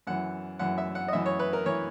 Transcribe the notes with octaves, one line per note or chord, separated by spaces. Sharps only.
F#2 E3 F#5
F#2 E3 F#5
E5
F#5
D#5
F#2 E3 E5
C#5
B4
A#4
E3 C#5